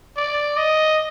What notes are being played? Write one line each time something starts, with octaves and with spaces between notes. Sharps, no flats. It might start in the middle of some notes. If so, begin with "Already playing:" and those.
D5
D#5